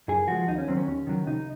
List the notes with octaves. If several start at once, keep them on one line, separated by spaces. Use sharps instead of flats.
F#2 G#4
F3 G#3 F#4
D#2 D#4
C#4
D#3 F#3 C4
C#4
D#2 C#4
D#3 F#3
C2 D#4